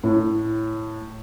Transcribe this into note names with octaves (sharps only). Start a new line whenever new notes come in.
A2